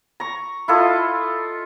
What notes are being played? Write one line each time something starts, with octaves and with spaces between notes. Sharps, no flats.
A#5 C#6
E4 F4 A4 D#5